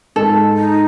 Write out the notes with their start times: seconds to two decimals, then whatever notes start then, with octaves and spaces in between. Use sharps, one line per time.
0.16 G#2 A4
0.57 D#4